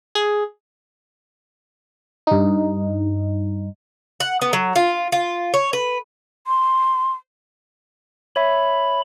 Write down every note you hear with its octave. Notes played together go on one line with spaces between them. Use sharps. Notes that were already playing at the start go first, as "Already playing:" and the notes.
G#4
G2 D#4
F#5
B3
F#3
F4
F4
C#5
B4
C6
C#5 E5 B5